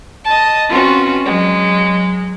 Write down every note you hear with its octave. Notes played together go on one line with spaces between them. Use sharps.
D#5 A5
C4 C#4 F4 F#4 B4
F#3 G#3